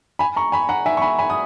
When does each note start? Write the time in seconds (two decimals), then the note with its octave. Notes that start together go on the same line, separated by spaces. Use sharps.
0.19 G#5 B5
0.36 A#5 C#6
0.52 G#5 B5
0.69 F#5 A#5
0.86 E5 G#5
0.97 C#6
1.02 G#5 B5
1.18 G#5 B5
1.30 D#6